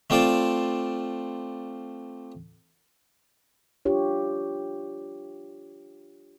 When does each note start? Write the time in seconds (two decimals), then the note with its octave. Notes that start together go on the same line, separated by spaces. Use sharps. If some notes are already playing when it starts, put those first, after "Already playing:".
0.10 A3 C4 F4 D5 A5
3.85 D4 F4 G4 C#5